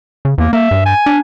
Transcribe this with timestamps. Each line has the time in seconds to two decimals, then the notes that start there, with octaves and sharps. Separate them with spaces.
0.25 C#3
0.38 E2 A#3
0.53 A#3 E5
0.71 G2
0.86 G#5
1.06 D4